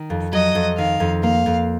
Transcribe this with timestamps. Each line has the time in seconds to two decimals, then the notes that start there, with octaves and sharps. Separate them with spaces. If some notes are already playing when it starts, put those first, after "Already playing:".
Already playing: D#3
0.10 F2
0.33 F#3 D#5
0.55 F2
0.77 D#3 F5
1.00 F2
1.23 A#3 F5
1.46 F2